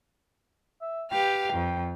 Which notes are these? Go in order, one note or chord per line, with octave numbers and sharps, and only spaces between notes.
E5
G4 B4 F5 G5
F2